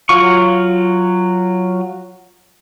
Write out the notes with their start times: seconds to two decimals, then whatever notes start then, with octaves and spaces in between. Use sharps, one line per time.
0.09 F#3 F4 C#6